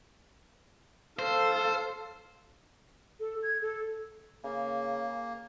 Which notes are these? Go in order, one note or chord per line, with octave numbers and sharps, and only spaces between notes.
A4 C5 F5
A4
G#6
A4
C#3 A#3